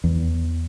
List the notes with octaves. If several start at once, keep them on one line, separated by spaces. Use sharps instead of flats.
E2